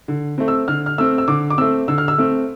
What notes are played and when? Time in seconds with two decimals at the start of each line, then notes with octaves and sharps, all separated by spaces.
0.08 D3
0.38 A3 C4
0.48 E6
0.68 D3 F6
0.86 F6
0.98 A3 C4 E6
1.18 E6
1.28 D3 D6
1.50 D6
1.58 A3 C4 E6
1.88 D3 E6
1.98 F6
2.08 E6
2.18 A3 C4